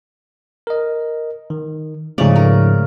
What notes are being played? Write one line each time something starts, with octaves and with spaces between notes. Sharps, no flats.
A#4 D#5
D#3
G#2 C#3 F3 A3 C#5 D5
A#4